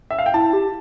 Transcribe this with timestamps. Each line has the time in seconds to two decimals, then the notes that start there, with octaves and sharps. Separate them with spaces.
0.11 E5
0.19 F5
0.26 G5
0.34 E4 A5
0.53 G4